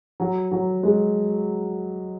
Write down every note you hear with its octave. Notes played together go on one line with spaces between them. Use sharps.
F#3
F#3
G#3